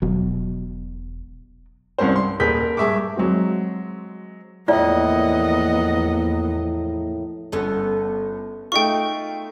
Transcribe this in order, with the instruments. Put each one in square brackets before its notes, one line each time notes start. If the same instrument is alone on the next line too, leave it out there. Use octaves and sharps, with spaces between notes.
[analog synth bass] E1 [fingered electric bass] B2 F#3
[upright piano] C2 G2 C#4 A#4 C5
C6
D#1 G#4 A#4 B4 G6 B6
A#4
G2 G#4 E5 C#6 D6
F#3 G#3 C4 F#4
[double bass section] E2 F3 A#3 [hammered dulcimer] A2 [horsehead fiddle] B3 D#5 [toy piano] F4 D5
[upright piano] G1 [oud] B3 C#4 A4
[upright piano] A3 D#4 F4 [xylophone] G5 C#6